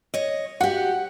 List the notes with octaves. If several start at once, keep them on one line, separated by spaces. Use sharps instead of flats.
C#5 D#5
F#4 G4 F#5